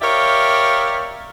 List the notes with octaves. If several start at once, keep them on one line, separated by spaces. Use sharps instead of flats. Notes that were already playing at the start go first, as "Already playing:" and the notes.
G4 A#4 C#5 D5 E5 F5